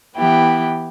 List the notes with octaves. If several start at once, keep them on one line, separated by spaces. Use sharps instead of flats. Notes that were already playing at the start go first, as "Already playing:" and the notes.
E3 B3 E4 G4